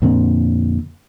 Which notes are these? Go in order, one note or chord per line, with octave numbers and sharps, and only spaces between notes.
F2 A#2 D3 C4